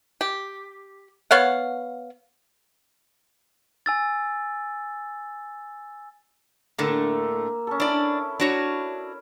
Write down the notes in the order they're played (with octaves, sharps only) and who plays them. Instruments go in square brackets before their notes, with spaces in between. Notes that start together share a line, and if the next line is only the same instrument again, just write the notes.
[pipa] G4
B3 C#5 F5 F#5
[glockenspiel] G#5 E6 A6
[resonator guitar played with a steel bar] A2 D3 A3 [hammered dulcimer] A#3 E5
[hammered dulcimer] C#4 A4
[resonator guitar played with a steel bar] D4 D5 [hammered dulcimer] E4 E5
[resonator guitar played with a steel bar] D4 F#4 C#5